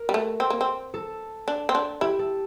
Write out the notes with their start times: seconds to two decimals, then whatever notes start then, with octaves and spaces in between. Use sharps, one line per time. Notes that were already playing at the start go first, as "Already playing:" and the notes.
Already playing: A#4
0.09 G3
0.14 A3
0.40 C4
0.50 A#3
0.61 C4
0.94 A4
1.48 D4
1.69 C4
1.75 D4
2.01 E4 G4
2.19 A4